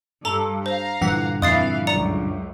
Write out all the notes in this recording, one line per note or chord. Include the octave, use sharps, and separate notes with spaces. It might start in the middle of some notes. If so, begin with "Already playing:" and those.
G2 A4 A#5
C5 F5 A#5
G2 A#2 D3 E3 F#5
F2 E3 F5 D#6 A6 C7
C#2 F#2 D5 A#5 C#7